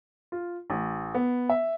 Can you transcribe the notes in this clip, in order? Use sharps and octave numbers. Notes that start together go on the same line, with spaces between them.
F4
A1
B3
E5